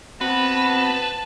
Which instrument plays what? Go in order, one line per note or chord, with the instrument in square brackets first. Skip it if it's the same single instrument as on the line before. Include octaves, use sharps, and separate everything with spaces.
[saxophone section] B3 F#4 [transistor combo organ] C4 [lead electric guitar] B4 [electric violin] A5